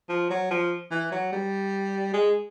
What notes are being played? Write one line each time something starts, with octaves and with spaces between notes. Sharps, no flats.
F3
F#3
F3
E3
F#3
G3
G#3